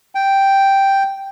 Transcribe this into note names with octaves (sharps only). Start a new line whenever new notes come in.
G5